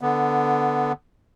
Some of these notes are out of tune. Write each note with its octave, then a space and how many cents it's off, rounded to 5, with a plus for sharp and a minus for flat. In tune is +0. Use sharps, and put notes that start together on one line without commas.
D3 +0 B3 +0